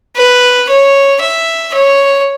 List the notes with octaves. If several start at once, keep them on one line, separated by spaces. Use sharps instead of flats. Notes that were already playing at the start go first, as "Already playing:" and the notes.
B4
C#5
E5
C#5